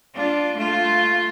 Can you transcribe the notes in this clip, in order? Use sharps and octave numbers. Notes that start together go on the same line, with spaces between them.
D4 F4
A3 F4